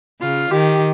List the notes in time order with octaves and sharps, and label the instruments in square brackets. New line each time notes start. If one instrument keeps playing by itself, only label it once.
[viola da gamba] C#3 [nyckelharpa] F4
[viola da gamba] D#3 [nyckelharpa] G4